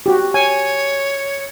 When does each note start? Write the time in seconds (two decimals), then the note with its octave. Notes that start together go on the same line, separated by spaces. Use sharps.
0.06 F#4 G4
0.34 C#5 G#5